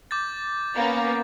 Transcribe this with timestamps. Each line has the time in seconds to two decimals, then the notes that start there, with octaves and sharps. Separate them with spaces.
0.11 D6 G6 A6
0.74 A#3 B3 C#4 A6